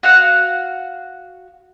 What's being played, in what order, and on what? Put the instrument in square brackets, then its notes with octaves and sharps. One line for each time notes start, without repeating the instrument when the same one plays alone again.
[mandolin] F#4 F5 F#5